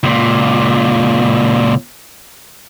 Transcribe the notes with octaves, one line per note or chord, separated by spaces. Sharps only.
C#2 A#2